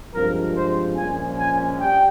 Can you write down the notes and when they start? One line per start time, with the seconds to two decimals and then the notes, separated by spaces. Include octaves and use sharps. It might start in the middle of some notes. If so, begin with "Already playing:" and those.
0.14 G2 F3 G#3 C4 A#4
0.55 C5
0.97 A#1 A#2 F3 G#3 C#4 G#5
1.38 G#5
1.80 G3 G5